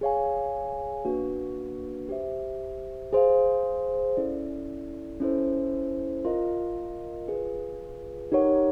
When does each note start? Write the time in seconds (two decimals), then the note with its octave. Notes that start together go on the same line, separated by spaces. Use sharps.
0.01 G#4 C#5 F5 G#5
1.05 A#3 D4 F#4 B4
2.09 G4 C5 E5
3.13 G#4 C5 F5
4.17 C#4 E4 A4 D5
5.20 C#4 E4 A4 C5
6.25 F4 A#4 D#5
7.28 F4 G#4 B4
8.32 D#4 G4 A#4 C#5 F#5